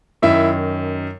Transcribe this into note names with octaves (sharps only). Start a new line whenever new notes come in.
F#2 D#3 E4 E5